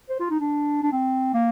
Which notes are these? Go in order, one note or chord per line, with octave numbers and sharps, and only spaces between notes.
C5
F4
D#4
D4
D4
C4
A#3